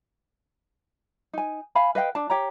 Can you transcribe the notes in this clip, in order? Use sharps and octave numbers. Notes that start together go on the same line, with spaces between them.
D#4 G#5
F5 G#5 B5
B4 D#5 F5 G5
D4 A5
G4 C#5 A#5